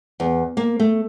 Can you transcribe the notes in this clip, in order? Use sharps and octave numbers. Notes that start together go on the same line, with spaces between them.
E2
A#3
A3